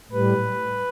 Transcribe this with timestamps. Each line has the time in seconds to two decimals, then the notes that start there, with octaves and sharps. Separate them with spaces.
0.12 A2 G3 B4